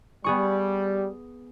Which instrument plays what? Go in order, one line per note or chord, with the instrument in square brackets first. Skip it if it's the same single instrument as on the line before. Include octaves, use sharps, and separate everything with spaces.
[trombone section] G3 [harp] B3 G#4 C#6